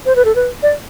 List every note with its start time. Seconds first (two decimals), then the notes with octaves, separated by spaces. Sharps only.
0.06 C5
0.16 B4
0.25 A4
0.35 B4
0.63 D5